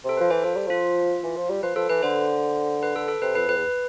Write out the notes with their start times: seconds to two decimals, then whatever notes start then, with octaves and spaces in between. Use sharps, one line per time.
0.04 C3 A4
0.17 F3 B4
0.30 E3 C5
0.43 F3 A4
0.56 G3
0.67 F3 F4
1.24 E3
1.36 F3
1.50 G3
1.63 F3 B4
1.76 F3 A4
1.89 E3 B4
2.03 D3 C5
2.83 B4
2.96 A4
3.08 A4
3.22 C3 B4
3.35 F2 B4
3.48 F2 B4
3.56 E2